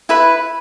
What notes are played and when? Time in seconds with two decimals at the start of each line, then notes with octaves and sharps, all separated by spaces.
0.09 E4 B4 E5 B5